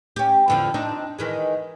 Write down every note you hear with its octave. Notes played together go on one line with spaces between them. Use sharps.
C#4 G4
E2 D3 F3
C4 D4 D#4
D#3 E3 G#3